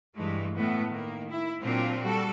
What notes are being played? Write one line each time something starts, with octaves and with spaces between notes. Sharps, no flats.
G2 E3 G#3 A3
A2 B3
D#3 A#3
E4
A#2 F#3 C4 D4 F4
G3 F#4 A4